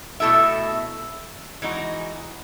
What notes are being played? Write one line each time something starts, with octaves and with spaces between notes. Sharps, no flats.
B2 A3 E4 A4 E5
E3 G#3 D#4 F#4